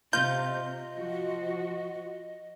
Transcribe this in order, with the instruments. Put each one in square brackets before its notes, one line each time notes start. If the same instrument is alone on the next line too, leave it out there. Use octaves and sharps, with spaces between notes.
[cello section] C3 [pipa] F4 [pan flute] D#5 [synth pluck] G6
[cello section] F3 F#4